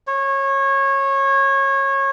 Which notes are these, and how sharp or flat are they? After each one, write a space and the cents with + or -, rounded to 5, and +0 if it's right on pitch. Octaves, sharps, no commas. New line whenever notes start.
C#5 -25